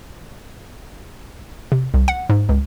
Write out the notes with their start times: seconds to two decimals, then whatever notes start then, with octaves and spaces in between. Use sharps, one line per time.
1.72 C3
1.94 C2
2.08 F#5
2.30 G#2
2.49 C#2